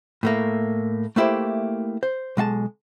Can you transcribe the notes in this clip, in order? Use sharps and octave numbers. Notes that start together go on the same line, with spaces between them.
A2 A3 A#3
A3 A#3 E4 G4 C5
C5
B1 G#3 F5 A5